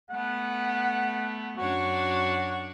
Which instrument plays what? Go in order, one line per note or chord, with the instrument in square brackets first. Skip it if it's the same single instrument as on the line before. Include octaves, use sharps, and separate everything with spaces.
[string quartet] A3 B3 [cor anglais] F#5
[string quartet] F#2 D4 C#5 [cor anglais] F#4